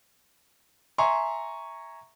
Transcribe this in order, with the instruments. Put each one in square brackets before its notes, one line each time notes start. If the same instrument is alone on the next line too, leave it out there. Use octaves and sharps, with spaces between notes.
[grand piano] E5 G#5 A#5 C6 C#6